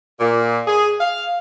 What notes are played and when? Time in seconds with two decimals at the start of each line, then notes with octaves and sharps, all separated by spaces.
0.20 A#2
0.67 G#4
1.00 F5